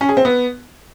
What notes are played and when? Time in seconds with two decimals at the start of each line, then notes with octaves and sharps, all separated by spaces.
0.01 C#4
0.09 G#4
0.17 C4
0.25 B3